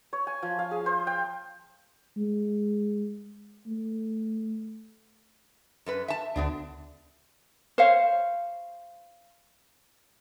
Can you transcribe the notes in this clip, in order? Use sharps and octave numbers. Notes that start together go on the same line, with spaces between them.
C#5
G#5
F3
F5
G#4
C5
G5
G#3
A3
F#2 A4 B4
E5 A5
D2 D3 B3 D4
C5 C#5 F5